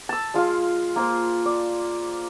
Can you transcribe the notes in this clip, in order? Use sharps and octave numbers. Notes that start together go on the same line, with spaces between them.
A5 E6
G#3 F4 G#4 F5
A#3 F4 C5
D5